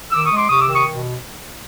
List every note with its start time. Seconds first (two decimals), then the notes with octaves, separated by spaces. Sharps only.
0.12 D#3 D6 E6
0.25 C#6 D#6
0.31 G#3
0.37 C6 D6
0.49 C3 C#6 D#6
0.61 D6 E6
0.68 D#3
0.75 C#6 D#6
0.87 B2